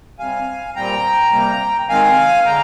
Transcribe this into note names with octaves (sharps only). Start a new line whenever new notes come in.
C3 G3 C4 F5 G#5
A#2 G3 C4 G5 A#5
C3 G3 A#3
D#3 G#3 C4 F5 G#5
D3 G#3 G5 A#5